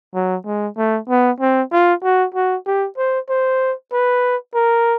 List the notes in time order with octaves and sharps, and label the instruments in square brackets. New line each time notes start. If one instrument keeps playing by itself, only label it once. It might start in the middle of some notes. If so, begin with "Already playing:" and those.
[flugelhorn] F#3
G#3
A3
B3
C4
F4
F#4
F#4
G4
C5
C5
B4
A#4